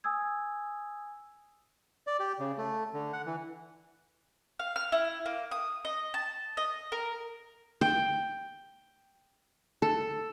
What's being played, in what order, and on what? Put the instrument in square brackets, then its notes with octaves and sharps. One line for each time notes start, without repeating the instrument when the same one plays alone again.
[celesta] G#5 D#6 E6 G#6
[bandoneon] D5
G4
C#3
A3
D3
F#5
E3
[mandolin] F5
F6
E4
A#3
D#6
D#5
A5
D#5
A#4
[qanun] G5
A4